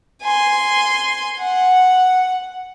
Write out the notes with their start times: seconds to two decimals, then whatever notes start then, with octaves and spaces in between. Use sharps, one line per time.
0.22 G#5 C6
1.39 F#5